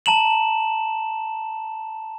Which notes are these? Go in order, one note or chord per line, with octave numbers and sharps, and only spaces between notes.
A5 A#5 E7 F#7